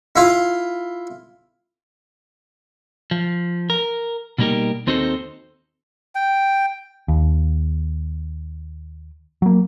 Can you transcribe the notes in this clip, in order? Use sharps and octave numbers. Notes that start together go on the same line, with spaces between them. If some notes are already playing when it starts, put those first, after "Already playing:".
E4 F4
F3
A#4
B2 G3 A#3 D#4 G4 A#4
D#2 C4 D#4 F#4 A4 C5
G5
D#2
F#3 A#3